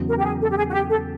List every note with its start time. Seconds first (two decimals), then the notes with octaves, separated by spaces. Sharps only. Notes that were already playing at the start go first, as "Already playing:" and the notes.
Already playing: E2 C#3 F#3
0.08 A#4
0.18 G4
0.25 G#4
0.41 A4
0.50 G4
0.57 G#4
0.68 F#4
0.73 G4
0.89 A4